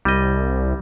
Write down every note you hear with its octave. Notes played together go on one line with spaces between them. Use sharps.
C2 G3 D#5